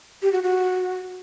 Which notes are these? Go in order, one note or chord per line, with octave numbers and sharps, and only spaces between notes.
G4
F#4
F#4